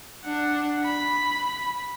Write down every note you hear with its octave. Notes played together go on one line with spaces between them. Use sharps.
D4 F#5
B5